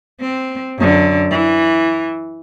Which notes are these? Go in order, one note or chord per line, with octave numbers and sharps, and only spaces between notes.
C4
F#2 D3
E3